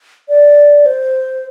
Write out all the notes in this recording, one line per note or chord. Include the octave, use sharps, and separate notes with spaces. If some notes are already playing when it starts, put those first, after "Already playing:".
D5
C5